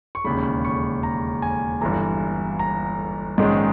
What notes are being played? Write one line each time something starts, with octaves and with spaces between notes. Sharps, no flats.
C#6
E1 D#2 C#3 B5
C#6
A#5
G#5
G1 G2 E3 A#5
A#5
A#1 G#2 D#3 G#3 C#4